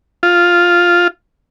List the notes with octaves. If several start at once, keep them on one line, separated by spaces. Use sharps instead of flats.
F4